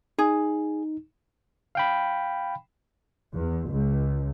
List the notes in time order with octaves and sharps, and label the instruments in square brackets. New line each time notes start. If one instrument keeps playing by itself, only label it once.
[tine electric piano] D#4 [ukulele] G#4
[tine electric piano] F5 G5 B5
[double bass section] E2
C#2